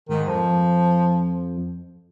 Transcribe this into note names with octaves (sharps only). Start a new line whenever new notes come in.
G#2 D#3
F2 F3